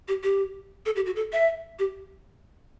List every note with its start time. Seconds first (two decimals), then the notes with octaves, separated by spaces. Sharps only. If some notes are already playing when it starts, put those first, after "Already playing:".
0.08 G4
0.23 G4
0.86 A4
0.96 G4
1.06 F#4
1.16 A4
1.33 E5
1.79 G4